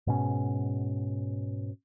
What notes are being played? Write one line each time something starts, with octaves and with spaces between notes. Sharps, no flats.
G#2 B2 C#4